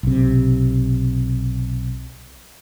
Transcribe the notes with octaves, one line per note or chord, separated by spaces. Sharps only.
B1 C3